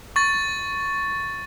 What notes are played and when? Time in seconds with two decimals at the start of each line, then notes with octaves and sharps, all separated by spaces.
0.16 C#6 A6